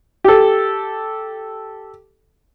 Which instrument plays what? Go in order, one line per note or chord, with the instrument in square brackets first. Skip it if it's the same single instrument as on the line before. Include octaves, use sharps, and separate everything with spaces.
[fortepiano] G4 A4